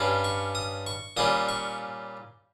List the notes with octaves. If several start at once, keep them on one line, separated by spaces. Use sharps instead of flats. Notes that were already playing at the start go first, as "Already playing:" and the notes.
Already playing: G2 G3 C#4 F4
C#6
D#6
C#6
A#2 G3 C#4 F4 D#6
C#6